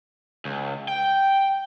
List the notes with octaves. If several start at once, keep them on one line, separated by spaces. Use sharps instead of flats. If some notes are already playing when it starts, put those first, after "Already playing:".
C#2
G5